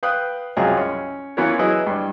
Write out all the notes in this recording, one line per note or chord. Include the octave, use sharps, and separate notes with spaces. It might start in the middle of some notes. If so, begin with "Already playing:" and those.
B4 F5 G5 D#6 F#6
C2 F#2 F#3 F4 G#4 D#5
C#4
E3 B3 C#4 F4 A#4 C#5
F#3 E4 G#4 B4 D#5 E5
G2 D4